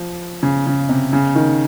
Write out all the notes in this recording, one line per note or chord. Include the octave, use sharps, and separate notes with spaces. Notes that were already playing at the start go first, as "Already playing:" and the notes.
Already playing: F3
C#3
C#3
C3
C#3
D#3